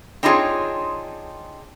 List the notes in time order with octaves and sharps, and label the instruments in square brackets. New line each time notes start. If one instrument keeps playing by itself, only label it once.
[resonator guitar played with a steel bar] C4 D4 D#4 F4 G#4 C#5